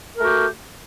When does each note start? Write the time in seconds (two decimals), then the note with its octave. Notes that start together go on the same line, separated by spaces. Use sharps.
0.17 A#4
0.20 A3
0.23 F#4
0.26 G4